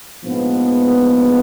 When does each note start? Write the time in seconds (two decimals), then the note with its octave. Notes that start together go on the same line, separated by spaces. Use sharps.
0.23 A#1 G#2 F3 G#3 B3